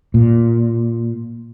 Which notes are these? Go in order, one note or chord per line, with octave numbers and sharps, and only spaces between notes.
A#2